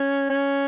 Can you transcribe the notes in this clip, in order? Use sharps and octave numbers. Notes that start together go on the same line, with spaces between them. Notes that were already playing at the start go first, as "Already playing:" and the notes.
Already playing: C#4
C#4